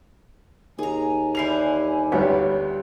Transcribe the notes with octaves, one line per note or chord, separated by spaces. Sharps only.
D#2 G#4 G#5 A#5
D3 G3 E4 C7 F7
G1 D2 G3 B3 C#5